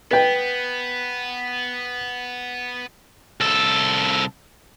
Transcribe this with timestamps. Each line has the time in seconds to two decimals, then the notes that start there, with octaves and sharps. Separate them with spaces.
0.11 B3 B4 G5
3.40 C2 A4